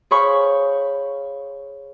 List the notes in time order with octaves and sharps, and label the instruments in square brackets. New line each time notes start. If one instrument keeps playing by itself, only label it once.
[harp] G#4 C5 C#5 F5 B5 C#6